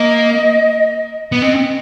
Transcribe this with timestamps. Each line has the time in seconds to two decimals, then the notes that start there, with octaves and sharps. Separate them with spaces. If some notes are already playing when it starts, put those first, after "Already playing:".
Already playing: A#3 D#5
1.32 B3
1.42 C4 D#5